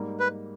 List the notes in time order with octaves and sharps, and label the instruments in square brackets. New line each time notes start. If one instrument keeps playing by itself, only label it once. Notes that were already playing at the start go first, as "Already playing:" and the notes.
Already playing: [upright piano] G#2 G3 A#3 D#4
[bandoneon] B4